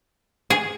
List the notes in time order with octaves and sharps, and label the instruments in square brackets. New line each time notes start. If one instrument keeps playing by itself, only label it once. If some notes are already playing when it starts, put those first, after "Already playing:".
[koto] G#4